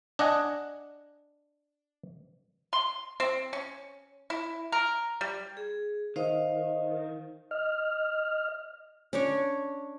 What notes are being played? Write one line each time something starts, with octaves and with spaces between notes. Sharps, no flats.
D4 D#5 F#5 G#5
C6
C4
C#4
E4
A#4
G3
G#4
D#3 C5 D#5 F5
D#5 F6
C#4 D4 C#5